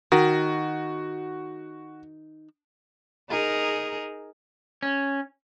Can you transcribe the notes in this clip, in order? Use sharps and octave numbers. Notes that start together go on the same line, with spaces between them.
D#3 F#4
D#4 G#4 A#4
C#4